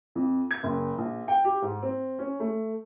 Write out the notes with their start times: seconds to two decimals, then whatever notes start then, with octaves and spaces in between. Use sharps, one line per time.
0.15 F2
0.51 G#6
0.63 F#1
0.98 A#1
1.28 G5
1.45 G4
1.62 G#2
1.82 C4
2.19 C#4
2.40 A3